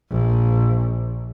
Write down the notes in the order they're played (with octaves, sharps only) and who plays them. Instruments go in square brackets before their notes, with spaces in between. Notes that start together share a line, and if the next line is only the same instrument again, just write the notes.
[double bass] A#1